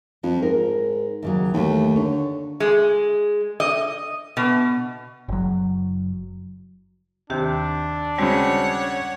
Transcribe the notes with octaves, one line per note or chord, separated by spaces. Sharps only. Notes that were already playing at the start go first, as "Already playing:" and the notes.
F2 F3
G#2 A#4
D#2 C#3 F#3
D#2 E3 A3 A#3
D3 C#5
G#3
D#5
B2
F#1 F#3
D#2 C3 D#3 D4 G4
C#3 G3 G#3 C4 F#4 C#5 F#5